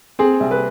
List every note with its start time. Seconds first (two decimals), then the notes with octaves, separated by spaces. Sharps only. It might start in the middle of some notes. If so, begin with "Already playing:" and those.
0.19 C4 G#4
0.40 C2
0.51 B4